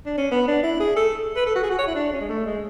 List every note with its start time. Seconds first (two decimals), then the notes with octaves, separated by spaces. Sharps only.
0.06 D4
0.18 C#4
0.31 B3
0.48 D4
0.63 E4
0.80 G#4
0.96 A4
1.36 B4
1.46 A4
1.56 F#4
1.63 G#4
1.70 F#4
1.79 C#5
1.88 E4
1.95 D4
2.13 C#4
2.21 G#3
2.29 A3
2.46 G#3